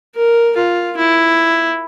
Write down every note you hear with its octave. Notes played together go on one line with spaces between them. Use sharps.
A#4
F4
E4